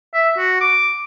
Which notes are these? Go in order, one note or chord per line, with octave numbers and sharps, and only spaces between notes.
E5
F#4
D6